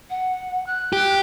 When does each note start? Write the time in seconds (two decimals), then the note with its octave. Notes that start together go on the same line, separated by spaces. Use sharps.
0.10 F#5
0.67 F#6
0.93 G4